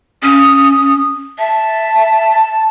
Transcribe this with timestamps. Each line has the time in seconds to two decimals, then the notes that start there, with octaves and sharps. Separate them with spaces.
0.23 C#4 D#6
1.39 E5 A5